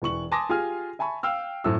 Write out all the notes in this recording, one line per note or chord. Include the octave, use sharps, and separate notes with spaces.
E1 E3 C#6 F#7
G#5 A5 C6 D6 D#6 A#6
F4 G4 G#4 G#5 F6
E5 G#5 A5 B5 C#6
F5 G5 E6 F6
F#2 A2 C4 A4 E5 E6